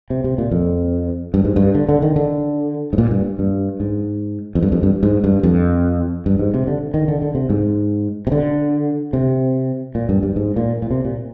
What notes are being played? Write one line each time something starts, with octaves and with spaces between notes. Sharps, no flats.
C3
C3
A#2
F2
G2
G#2
G2
D3
D3
D#3
D3
G#2
A#2
G2
G2
G#2
F2
G2
F2
G2
G#2
G2
F2
G2
G#2
C3
D3
D#3
D3
D3
C3
G#2
C3
D3
C3
A#2
G2
G2
G#2
A#2
A#2
C3
A#2